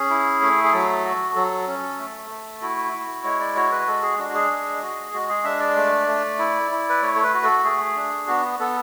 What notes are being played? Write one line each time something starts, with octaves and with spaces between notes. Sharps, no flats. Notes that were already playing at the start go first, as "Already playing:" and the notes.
Already playing: C#4 G#4
E4
A3
G#4
F#3 A4
F#4
F#3 A4
C#4
A3
A3
E4 F#4
E4
G#3 C#5
D5
F#4 C#5
B4
G#3 A4
G#4
D4 F#4
F#4
G#4
G#3
F#4
G#3 F#4
G#4
D4 E5
D5
A3
A3
E4
E4
B4
A3 C#5
A4
B4
F#4
A4
A3 G#4
D4
B3 F#4
B3 A4